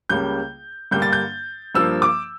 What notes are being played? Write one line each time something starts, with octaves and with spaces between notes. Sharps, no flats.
C#2 C#3 G3 A#3 G6
G2 D3 G3 A#3 G6
A6
G6
G2 F3 A#3 E6
D6